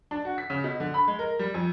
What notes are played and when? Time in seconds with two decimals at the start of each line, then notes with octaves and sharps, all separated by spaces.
0.11 D4
0.25 F#4
0.38 B6
0.50 C#3
0.64 B2
0.80 D3
0.94 B5
1.08 G#3
1.19 A#4
1.39 G3
1.54 F2